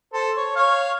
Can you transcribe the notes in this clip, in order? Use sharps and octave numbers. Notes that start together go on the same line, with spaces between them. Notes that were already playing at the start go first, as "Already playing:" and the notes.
A4 C5
C#5
C#5 F5